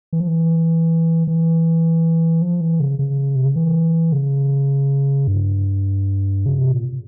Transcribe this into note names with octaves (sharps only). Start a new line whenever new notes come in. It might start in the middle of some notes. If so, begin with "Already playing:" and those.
E3
F3
E3
E3
F3
E3
C#3
C#3
C3
C#3
E3
C#3
G2
C#3
C3
A#2